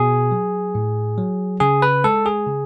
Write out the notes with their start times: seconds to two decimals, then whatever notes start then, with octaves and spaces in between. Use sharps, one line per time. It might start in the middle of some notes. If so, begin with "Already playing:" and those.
Already playing: B2 G#4
0.31 F#3
0.75 A2
1.18 F#3
1.60 C#3 G#4
1.82 B4
2.04 G#3 A4
2.26 G#4
2.47 C#3